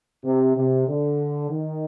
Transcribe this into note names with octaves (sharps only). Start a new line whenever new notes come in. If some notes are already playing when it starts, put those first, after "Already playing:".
C3
C3
D3
D#3